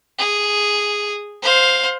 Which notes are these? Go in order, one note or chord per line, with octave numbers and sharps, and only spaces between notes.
G#4
C5 F5